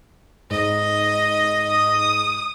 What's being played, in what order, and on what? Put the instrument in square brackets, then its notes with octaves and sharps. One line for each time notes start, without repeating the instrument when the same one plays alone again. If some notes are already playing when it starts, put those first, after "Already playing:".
[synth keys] G#2 [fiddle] D#5
[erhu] D#6